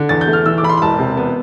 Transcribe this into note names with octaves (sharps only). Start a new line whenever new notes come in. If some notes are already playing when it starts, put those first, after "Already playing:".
Already playing: D3
E2 A6
G6
A3
F6
E3 E6
D6
E2 B5
C6
B5
E1 A5
C3
B3